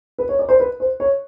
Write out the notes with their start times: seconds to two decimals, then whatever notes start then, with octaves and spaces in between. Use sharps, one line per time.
0.19 B4
0.29 C#5
0.39 D5
0.49 C5
0.60 B4
0.80 C5
1.00 C#5